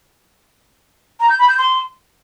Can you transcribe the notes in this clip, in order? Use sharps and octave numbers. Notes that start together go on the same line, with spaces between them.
A#5
G6
B5
G6
C6